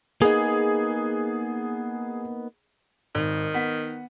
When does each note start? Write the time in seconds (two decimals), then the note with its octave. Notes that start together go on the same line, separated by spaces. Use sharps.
0.22 A#3 B3 D#4 G#4
3.15 G#1 D#3
3.54 B3 F#5 B6